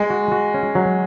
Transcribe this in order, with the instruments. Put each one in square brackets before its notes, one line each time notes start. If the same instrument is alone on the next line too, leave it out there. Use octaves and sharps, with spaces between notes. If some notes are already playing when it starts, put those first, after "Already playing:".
Already playing: [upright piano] G#3
[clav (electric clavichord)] F#4
F#4
C#4
F#3